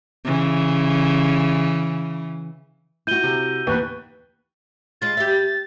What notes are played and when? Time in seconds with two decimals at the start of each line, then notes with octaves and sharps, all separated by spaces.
0.24 C#3 E3
3.07 E4 F#4 G6 D#7 G7
3.24 C3
3.67 D#2 E3 B3 B4
5.02 G#3 F4 A6
5.17 G4 E5